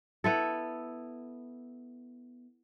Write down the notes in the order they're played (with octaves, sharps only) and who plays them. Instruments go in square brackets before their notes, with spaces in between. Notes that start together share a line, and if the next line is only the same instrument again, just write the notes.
[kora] B3 E4 A4